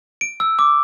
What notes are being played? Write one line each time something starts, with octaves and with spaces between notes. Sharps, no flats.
D7
E6
D6